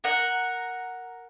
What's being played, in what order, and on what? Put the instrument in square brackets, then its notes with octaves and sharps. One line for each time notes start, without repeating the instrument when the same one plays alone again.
[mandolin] A#4 F#5